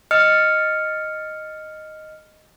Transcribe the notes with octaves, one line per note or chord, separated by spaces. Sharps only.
D#5 F6 C#7